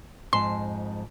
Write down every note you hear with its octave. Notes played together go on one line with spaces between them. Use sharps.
F2 G#2 A5 C6